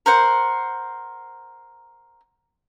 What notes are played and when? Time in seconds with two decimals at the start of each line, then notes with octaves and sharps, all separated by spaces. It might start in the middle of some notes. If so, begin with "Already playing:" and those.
0.06 A#4 C5 F#5